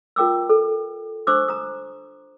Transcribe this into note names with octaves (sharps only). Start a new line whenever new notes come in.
F4 A#4 G5 D6 E6
A4
D4 C5 C#6 D6 E6
A#5 D#6